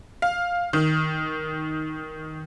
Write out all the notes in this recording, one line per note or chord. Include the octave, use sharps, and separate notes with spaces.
F5
D#3